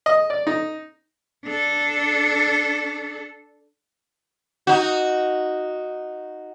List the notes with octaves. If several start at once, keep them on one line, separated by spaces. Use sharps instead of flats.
D#5
D5
D#4
D4 A4
D#4 F#4